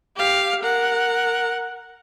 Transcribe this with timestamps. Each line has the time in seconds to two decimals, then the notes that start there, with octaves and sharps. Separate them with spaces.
0.16 G4 F5
0.63 A#4 F#5